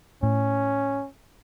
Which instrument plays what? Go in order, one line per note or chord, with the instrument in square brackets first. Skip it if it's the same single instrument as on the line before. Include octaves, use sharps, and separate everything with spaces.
[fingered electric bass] A2 [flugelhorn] C#4